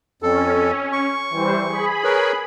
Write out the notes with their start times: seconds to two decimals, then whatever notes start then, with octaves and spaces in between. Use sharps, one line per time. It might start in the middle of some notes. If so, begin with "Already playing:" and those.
0.22 F2 C#4 A4
0.92 C#6
1.30 E3 G3 C5
1.66 G#4 B5
2.04 A#4 B4 C#5